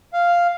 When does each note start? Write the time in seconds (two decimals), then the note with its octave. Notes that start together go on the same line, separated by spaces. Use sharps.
0.13 F5